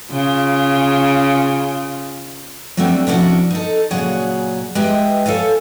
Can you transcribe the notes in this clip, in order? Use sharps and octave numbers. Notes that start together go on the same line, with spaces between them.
C#3 F4
F#3 G3 A3 C4 D4
C3 F3 C#4 D4 E4 F#4
D#4 A4
A#2 C#3 F#3 G#4 C#5 F#5
G#3 G4 B4 D#5 E5 G5
A4 C#5 F5 G#5